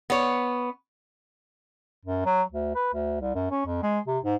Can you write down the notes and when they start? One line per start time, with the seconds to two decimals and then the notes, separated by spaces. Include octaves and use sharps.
0.10 B3 C#5
2.05 F#2
2.26 F#3
2.52 D2
2.75 B4
2.94 D2
3.21 C2
3.35 F#2
3.51 C#4
3.66 F2
3.83 G#3
4.07 C3
4.24 G#2